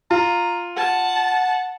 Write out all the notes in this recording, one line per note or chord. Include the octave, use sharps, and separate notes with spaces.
F4 A#5
F#5 A5